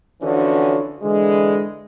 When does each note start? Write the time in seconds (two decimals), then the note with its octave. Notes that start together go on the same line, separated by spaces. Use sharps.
0.22 D3 E3 F3 C#4 F#4
1.03 D3 E3 G#3